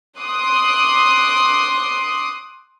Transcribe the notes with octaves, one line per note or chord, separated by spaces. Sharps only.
C6 D6 D#6 F#6